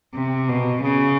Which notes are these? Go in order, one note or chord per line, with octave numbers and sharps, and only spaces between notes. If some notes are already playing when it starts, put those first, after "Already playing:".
C3
B2
C#3